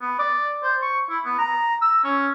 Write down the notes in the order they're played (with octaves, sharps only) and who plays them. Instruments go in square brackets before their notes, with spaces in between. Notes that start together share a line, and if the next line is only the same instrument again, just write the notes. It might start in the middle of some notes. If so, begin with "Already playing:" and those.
[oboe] B3
D5
C5
C#6
E4
B3
A#5
E6
C#4